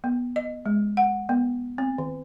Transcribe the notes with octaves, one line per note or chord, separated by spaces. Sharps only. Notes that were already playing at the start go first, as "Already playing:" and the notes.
B3
D#5
G#3
F#5
B3
C4
D#3